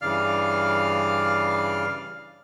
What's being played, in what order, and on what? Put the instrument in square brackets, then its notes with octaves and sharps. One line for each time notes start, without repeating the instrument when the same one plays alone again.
[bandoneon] G2 C#3 E3 D5 F5 F6